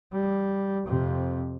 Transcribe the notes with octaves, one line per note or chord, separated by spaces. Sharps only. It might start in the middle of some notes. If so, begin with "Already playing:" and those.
G3
F2 C3